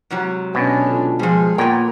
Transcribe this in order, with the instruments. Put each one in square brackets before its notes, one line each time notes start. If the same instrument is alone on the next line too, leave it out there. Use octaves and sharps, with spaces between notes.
[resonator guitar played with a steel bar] G#2 C3 F#3
[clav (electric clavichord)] B2 [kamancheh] C#4 D4 [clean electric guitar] F#5
[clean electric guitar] D3 F4 A4
[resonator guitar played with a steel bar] F3 G3 [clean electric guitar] G#3 C5 C6 [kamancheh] G#4
[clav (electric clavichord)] A#2 [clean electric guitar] A#3 C#5 [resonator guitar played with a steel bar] B3 G5 [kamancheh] A#4